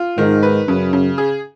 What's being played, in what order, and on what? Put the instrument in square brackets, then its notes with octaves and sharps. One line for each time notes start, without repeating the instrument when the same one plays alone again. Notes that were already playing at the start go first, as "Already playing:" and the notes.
Already playing: [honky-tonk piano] F4
[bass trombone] G#2 [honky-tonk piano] D#3
[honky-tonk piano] B4
[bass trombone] F#2 [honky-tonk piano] C#3
[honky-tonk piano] C#3
G#4